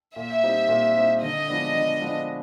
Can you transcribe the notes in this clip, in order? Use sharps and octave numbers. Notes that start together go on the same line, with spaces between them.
A#2 E5
G3 C4 D#4
A#2
G3 C4 D#4
D3 D#5
F3 G#3 B3 D4
D3
F3 G#3 B3 D4